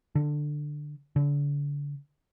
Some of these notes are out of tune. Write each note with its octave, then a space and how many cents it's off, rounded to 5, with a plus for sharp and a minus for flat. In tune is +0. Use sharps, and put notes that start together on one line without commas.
D3 +10
D3 -35